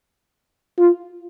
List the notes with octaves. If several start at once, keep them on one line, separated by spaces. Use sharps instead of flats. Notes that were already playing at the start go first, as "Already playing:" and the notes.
F4